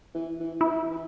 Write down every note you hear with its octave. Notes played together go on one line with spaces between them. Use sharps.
E3
E3
E3 E4
E3